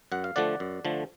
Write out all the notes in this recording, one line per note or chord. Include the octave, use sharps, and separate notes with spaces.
F#2 F#5
F5
D3 F3 A3 D5 F#5
F#2
D3 F3 A3